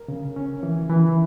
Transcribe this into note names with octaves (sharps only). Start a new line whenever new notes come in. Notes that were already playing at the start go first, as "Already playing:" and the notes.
Already playing: A#4
C#3
C#4
E3
E3